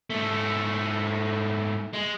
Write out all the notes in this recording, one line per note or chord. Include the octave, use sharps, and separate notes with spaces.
G#2 A3
G#3